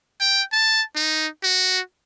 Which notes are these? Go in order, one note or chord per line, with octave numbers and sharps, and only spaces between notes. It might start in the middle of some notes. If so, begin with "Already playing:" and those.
G5
A5
D#4
F#4